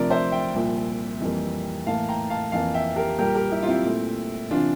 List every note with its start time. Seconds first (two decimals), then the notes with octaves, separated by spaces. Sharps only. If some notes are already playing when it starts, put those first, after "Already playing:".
Already playing: D2 C3 F3 A#4 D5
0.10 C5 E5
0.32 E5 G5
0.54 C2 A#2 F3
1.20 F2 E3 G3 A#3
1.86 A2 E3 A#3 F5 A5
2.09 G5 A#5
2.30 F5 A5
2.52 F2 E3 A#3 F5 A5
2.74 E5 G5
2.96 G4 A#4
3.18 A#2 G3 A#3 G4 A#4
3.35 G4 A#4
3.52 E4 G4
3.63 F4
3.68 C4 E4
3.85 A#2 A3
4.51 C3 E3 D4 F4